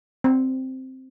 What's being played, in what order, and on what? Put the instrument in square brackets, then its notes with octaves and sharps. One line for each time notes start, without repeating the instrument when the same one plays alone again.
[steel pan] C4